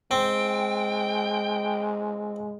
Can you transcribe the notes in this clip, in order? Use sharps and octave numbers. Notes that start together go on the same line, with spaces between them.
G#3 C4 G5